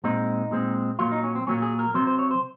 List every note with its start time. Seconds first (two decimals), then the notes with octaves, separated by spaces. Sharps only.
0.04 A#2 G#3 C4 D#4
0.51 A#2 G#3 C4
0.99 A#2 F#3 A#3 F4
1.11 D#4
1.23 C#4
1.35 C4
1.47 A#2 F#3 A#3 C#4
1.62 G#4
1.79 A#4
1.94 C3 F#3 C4 C5
2.07 C5
2.19 C#5
2.31 C5